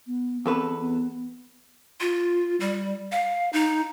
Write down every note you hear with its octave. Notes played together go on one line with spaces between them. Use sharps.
B3
E2 C4 A4 B4
B3
F4
G3
F5
D#4